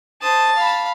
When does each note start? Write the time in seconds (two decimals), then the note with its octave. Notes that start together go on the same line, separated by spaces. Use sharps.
0.22 C5 A5 D#6
0.55 F5 B5